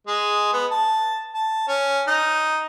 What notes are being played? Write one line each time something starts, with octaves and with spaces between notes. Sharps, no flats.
G#3
B3
A5
A5
C#4
D#4